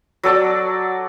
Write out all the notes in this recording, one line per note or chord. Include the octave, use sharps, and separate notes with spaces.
F#3 A4 D5